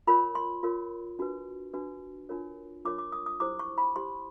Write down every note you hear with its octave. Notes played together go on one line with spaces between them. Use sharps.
F4 A#4 C#5 B5
C6
F4 A#4 C#5
D4 F#4 B4
D4 F#4 B4
D4 F4 A#4 C#5
D4 F4 A#4 C#5 D6
D6
D#6
D#6
E4 G4 C5 D6
C#6
B5
E4 G4 C5 C6